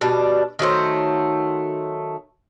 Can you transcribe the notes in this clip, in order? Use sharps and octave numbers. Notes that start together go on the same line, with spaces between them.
B2 G3 D4
D#3 F#3 A3 C5